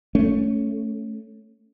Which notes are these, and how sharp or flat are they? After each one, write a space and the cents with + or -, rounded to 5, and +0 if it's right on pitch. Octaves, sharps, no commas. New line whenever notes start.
A3 +0 C#4 +0